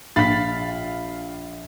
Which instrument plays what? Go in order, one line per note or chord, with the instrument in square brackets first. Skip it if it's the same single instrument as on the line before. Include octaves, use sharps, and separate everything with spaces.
[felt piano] A#1 B6 [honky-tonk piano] F5 B5 A6